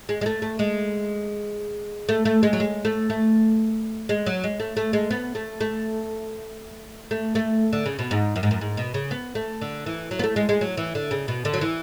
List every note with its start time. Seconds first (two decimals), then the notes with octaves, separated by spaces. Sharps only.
0.09 G#3
0.21 G#3
0.26 A3
0.42 A3
0.59 G#3
2.09 A3
2.25 A3
2.43 G#3
2.53 F#3
2.60 G#3
2.85 A3
3.10 A3
4.09 G#3
4.26 F#3
4.44 G#3
4.60 A3
4.77 A3
4.93 G#3
5.11 B3
5.35 A3
5.61 A3
7.11 A3
7.35 A3
7.73 D3
7.86 C#3
7.99 B2
8.11 G#2
8.36 F#2
8.43 G#2
8.51 F#2
8.61 G#2
8.77 B2
8.94 C#3
9.11 B3
9.35 A3
9.61 D3
9.86 E3
10.11 F#3
10.19 B3
10.24 A3
10.36 G#3
10.49 G#3
10.61 F#3
10.77 E3
10.95 D3
11.11 C#3
11.28 B2
11.45 D3
11.54 F#3
11.61 E3